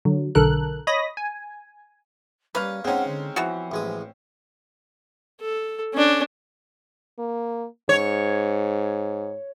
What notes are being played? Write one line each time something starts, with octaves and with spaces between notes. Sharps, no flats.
D3 F#3
B1 D3 A4 A#4 F#6
C#5 D#5 B5 D#6 A#6
G#5
G3 A#3 C#4 B4 F5
G#3 C4 C#4 D#4 F#5
D3
E3 F3 B3 F#4
A1 G#3 D#6
A4
C#4 D4
A#3
G#2 C#5